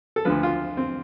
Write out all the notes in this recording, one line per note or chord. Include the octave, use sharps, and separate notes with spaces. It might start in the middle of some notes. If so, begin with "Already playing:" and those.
A4
D2 D3 F3 B4
F4
C4